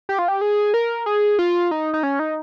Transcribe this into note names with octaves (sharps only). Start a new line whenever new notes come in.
G4
F4
G4
G#4
A#4
G#4
F4
D#4
D#4
C#4
D#4